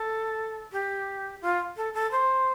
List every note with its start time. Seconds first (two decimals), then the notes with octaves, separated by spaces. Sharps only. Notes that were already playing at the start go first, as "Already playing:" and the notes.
Already playing: A4
0.72 G4
1.41 F4
1.77 A4
1.94 A4
2.11 C5